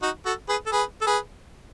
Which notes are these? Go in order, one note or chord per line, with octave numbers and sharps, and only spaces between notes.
D#4 F#4
F#4 A4
G#4 B4
A4
G#4 B4
A4
G#4 B4